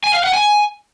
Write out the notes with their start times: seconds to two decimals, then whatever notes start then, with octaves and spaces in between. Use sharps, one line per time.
0.04 G#5
0.14 F5
0.24 F#5
0.34 G#5